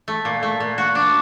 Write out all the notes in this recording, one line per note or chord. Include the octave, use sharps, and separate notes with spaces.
A3
A#2
A3
A#2
F#4
D4